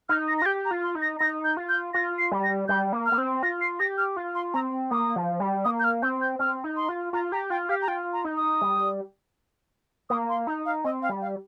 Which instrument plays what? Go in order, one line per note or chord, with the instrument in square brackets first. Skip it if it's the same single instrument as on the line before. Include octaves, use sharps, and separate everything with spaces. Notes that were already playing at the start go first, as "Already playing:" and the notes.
[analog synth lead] D#4 [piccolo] F6
[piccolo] A#6
A#6
[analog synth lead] F4
[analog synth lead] G4 [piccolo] G6
[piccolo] A#5
[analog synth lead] F4
[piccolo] C6
[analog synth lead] D#4
[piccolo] A#6
[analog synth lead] D#4 [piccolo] A#6
[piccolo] G6
[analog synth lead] F4
[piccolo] G6
[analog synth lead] F4 [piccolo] A#6
[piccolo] C7
[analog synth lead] G3
[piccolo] A#6
[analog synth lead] G3 [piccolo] G6
[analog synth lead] A#3
[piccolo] F6
[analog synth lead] A#3
C4
[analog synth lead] F4 [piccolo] A#6
[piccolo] C7
[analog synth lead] G4 [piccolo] A#6
[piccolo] F6
[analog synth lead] F4
[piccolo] C6
[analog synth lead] C4 [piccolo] A#5
[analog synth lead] A#3 [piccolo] D#6
[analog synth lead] F3
G3
[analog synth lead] A#3 [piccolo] D#6
[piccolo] G6
F6
[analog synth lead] C4 [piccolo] G6
[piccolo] G6
[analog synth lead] C4 [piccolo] F6
[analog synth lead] D#4
[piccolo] C6
[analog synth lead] F4
[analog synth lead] F4 [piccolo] A#5
[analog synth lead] G4 [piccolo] A#5
[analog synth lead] F4 [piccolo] G5
[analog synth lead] G4 [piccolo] F5
[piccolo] A#5
[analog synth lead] F4 [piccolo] G5
[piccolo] A#5
[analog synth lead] D#4
[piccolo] D#6
[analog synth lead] G3
[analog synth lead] A#3 [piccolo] D#6
[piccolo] C6
[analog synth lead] D#4 [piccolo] A#5
[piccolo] F5
[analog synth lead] C4 [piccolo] D#5
[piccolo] F5
[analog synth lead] G3
[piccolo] F5